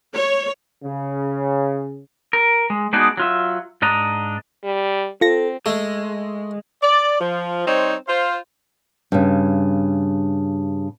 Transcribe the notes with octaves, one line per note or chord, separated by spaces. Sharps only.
C#5
C#3
A#4
G#3
G#3 B3 D4 D#4 F#4 G#4
F#3 F4 E5
G#2 D4 D#5 A#5
G3
C4 F4 A4 A#6
G#3 A3
D5
F3
G3 C4 D#4 C5 C#5
F4 C5
G2 C#3